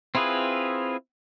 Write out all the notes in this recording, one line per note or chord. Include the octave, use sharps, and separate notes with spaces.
C4 E4 F4 G#4 B4